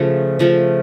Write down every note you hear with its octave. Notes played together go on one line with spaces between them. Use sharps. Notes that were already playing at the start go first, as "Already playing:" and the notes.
Already playing: C#3 F3 A3
C#3 F3 A3